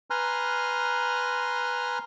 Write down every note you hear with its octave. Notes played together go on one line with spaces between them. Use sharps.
B4 G#5 A#5 C6 F6 F#6